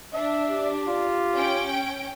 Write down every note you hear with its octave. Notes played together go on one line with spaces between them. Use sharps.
D4 E5
G4
F4
C#4 G5 D7